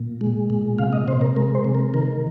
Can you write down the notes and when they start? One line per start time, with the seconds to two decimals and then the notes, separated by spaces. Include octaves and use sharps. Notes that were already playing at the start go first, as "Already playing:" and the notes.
Already playing: A#2
0.21 G#3
0.50 A#2
0.78 C3 F5
0.93 D#5
1.08 C3 C5
1.21 A#4
1.36 G#3 A#4
1.55 C5
1.64 C3
1.75 A#4
1.94 D#3 A#4